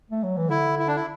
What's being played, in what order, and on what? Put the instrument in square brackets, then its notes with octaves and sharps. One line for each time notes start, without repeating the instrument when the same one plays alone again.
[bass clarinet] A3
F#3
E3
[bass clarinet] D3 [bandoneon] E4
[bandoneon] E4
D4
E4